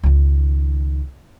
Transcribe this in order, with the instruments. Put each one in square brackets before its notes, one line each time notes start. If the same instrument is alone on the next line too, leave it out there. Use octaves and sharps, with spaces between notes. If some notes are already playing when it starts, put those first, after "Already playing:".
[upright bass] C#2 D#3